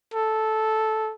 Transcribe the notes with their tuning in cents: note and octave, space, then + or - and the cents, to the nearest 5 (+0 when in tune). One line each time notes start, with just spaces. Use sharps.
A4 -10